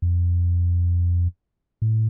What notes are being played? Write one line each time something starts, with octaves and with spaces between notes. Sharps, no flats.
F2
A2